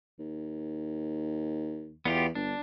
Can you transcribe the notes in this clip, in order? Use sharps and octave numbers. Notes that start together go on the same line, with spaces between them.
D#2
E2 B3 F4 G4
G1 D4